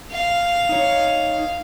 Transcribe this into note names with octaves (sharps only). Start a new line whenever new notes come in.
F5
D#4 C#5